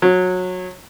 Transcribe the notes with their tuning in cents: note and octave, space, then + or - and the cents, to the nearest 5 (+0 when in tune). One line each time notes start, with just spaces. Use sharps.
F#3 -20